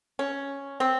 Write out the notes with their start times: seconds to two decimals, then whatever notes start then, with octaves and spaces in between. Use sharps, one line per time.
0.19 C#4
0.80 C4